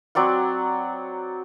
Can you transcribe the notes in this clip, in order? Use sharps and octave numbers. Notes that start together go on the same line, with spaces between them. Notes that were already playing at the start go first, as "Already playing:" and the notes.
F#3 C4 D5 F#5